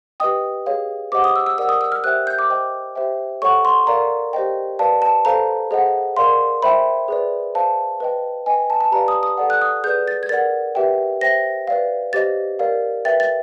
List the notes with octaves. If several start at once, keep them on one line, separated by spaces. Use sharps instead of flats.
G4 B4 D#5 G5 D#6
G#4 C#5 F5
G4 C5 D#5 F#5 D6
D#6
E6
E6
A#4 D5 F#5 E6
D#6
E6
F6
G4 C5 E5 G5 F#6
G6
D6
C5 D#5 G5
G4 C5 E5 G5
A4 C#5 F#5 C#6
C6
A#4 D5 F5 A#5
G4 C5 D#5 G5
B4 D5 F5 A5
A5
A4 C5 F5 A#5
G#4 C5 D#5 F#5
A#4 D5 F5 C6
C5 E5 G5 B5
G#4 B4 D5
C5 F5 A5
B4 D#5 G5
B4 D#5 G5 G#5
A5
A5
G4 B4 D5 F5 A#5
D#6
D#6
A4 D5 F#5
F#6
D#6
G#4 B4 D5 G6
A6
G#6
A#4 D5 F#5 A6
G4 B4 E5 G5
C5 E5 G5 A#6
B4 D5 F5
G4 C5 D#5 A6
A#4 D5 F5
B4 E5 G5 A6
A6